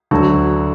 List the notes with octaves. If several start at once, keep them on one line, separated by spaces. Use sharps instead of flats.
D2 D3 F#3 F#4 A4